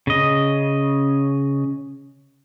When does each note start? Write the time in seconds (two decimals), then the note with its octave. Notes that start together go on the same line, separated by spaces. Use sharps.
0.07 C#3 D#5